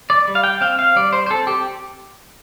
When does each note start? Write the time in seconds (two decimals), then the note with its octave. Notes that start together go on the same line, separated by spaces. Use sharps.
0.10 D5
0.28 G3
0.35 F5
0.44 G5
0.61 C4 F5
0.79 F5
0.96 G3 D5
1.13 C5
1.26 C5
1.30 C4 A4
1.47 G4